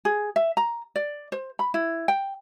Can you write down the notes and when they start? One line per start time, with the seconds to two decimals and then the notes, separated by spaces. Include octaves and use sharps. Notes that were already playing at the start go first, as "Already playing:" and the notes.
0.05 G#4
0.36 E5
0.57 A#5
0.96 D5
1.32 C5
1.59 B5
1.74 E4
2.08 G5